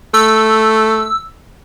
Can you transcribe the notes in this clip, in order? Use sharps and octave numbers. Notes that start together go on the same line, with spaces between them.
A3 E6